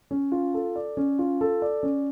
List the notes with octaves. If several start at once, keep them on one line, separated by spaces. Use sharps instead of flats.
C#4
F4
A4
D5
C#4
F4
A4
D5
C#4